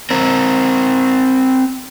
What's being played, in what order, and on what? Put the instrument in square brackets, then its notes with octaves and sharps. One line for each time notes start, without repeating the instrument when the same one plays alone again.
[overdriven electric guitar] C4 A#4